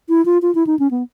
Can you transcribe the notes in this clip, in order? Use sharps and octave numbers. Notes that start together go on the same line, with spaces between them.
E4
F4
F4
E4
D#4
C#4
B3